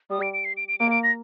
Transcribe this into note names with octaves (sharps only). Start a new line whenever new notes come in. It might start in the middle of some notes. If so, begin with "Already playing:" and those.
G3 D#6
D7
D7
C7
D7
D7
A#3 D7
D7
A#6